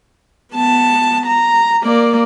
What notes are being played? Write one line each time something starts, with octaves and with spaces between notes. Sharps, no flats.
B3 A5
A#5
A#3 D5